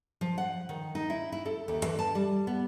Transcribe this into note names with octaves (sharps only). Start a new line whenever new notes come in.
F3
F#5
D#3
D#4
E4
E4
A4
D#2
E3
A5
G3
B3